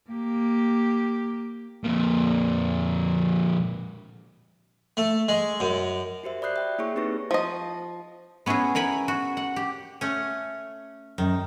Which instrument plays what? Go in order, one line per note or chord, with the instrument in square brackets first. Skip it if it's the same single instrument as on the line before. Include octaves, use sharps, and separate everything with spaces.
[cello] A#3 G4
[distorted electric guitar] F2 A#2
[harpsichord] A3
G#3
F#2
[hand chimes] F#4 G4 C5 E5
D5 B5 D#6 F#6 G6 C7
E5 G5
A#3 E4 G#4 C#5 C#6
C4 D#4 G4 B4 C#6 A#6
[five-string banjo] F3 D#5
[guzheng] B3 C#4 E4 F#4 G#4
A#4 F#5 G#5 B5
F#4
F#5
G4
[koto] A3 C#4
[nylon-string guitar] F#2 [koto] D#3